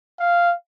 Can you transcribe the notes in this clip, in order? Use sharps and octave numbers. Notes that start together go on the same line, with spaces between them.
F5